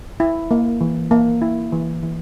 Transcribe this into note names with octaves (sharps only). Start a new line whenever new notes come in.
E4
A#3
E3
A#3
E4
E3
E3